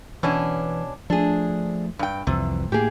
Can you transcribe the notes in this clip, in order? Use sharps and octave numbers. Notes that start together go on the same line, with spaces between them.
B2 E3 C#4 D4
F3 A3 D4 G#4
G2 G5
C2 F2 C3 E3
A2 A#3 G4 G#4